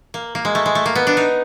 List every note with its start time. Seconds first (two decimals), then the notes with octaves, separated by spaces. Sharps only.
0.14 A#3
0.35 A#3
0.45 G#3
0.55 A3
0.66 G#3
0.75 A3
0.86 A#3
0.95 B3
1.07 D4
1.17 D#4